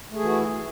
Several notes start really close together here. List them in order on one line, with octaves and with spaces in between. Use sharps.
A3 G#4 E3 F#4 E4